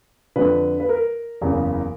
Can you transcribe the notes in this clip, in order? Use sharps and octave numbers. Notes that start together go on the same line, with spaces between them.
F2 D3 F3 B4
B4
A#4
F#1 E2 C#3